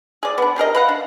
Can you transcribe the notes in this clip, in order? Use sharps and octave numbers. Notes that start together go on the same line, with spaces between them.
G#4 D5
B3 D4
G4 G#4 A#4 D#5
B4 F5 F#5
D4